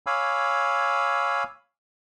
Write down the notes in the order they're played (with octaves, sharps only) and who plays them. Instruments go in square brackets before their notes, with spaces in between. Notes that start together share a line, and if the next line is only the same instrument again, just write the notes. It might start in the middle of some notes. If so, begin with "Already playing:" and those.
[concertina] C#5 F5 G#5 B5 D6 E6